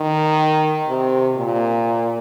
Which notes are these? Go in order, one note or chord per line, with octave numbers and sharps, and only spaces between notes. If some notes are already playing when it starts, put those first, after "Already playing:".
Already playing: D#3
C3
A#2